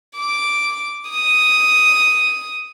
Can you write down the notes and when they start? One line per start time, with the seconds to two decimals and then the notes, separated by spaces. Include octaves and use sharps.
0.18 D6
1.10 D#6